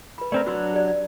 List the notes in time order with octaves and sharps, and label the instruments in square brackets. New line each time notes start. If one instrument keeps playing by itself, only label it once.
[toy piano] B4 B5
[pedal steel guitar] A3 C4 A#4 [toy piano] D5
[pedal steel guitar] F#3 D4 [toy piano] F#4 C6 E6
[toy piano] G4 D5
D5